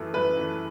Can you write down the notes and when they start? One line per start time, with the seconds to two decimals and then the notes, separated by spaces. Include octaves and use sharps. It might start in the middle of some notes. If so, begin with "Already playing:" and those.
Already playing: F#2 E3 A3
0.14 F#2 B4
0.37 E3 A3